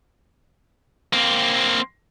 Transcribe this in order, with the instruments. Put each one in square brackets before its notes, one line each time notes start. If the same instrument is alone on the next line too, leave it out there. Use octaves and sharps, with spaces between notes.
[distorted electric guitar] A#3 C4